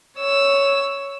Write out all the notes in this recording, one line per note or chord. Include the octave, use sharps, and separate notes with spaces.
C#5 E6